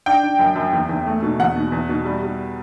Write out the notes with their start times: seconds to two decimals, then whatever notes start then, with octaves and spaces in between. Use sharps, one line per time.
0.06 D4 G5
0.23 D4
0.39 F#2
0.56 F#2
0.73 E2
0.89 E2
1.06 A3
1.22 B2
1.39 E2 F#5
1.56 B2
1.72 E2
1.89 B2
2.05 G3
2.23 G3